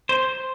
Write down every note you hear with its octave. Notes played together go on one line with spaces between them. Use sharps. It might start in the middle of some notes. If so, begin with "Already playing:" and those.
C5